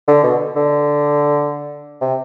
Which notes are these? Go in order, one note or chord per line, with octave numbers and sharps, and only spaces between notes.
D3
B2
D3
C3